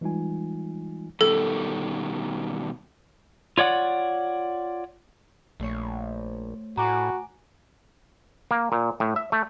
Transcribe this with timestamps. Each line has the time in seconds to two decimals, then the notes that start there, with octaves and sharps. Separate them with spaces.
0.01 E3 G3 G#3 D#4 F4 G#5
1.21 B2 D#3 G3 A4
3.58 F4 C#5 D5 F#5
5.60 A#1 A3 C5 C#5
6.78 A2 F#4 G#5 A#5 D6 F#6
8.51 A#3
8.72 A#2
9.00 A2
9.16 E5
9.32 A3